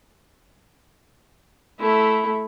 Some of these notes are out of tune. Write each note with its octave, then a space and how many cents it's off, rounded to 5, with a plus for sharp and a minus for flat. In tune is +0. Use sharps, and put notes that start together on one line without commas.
A3 -10 E4 +0